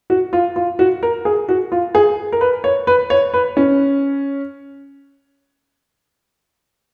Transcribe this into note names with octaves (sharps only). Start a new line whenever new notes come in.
F#4
F4
F4
F#4
A#4
G#4
F#4
F4
G#4
A#4
B4
C#5
B4
C#5
B4
C#4